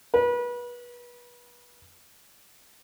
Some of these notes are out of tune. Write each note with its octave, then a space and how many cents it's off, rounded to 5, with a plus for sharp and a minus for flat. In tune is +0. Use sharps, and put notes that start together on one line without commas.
B4 -30